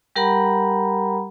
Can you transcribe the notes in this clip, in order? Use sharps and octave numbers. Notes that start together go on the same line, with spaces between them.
G3 G4 A#4 F#5 A#5 B5